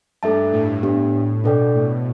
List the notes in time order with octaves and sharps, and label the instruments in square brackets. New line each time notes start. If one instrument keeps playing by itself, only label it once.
[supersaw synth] G2 [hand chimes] A3 D4 A4 E5 A5
[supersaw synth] A2
[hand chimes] B3 D4 G4
[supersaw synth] B2 [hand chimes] D4 A4 D5 G5
[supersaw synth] A2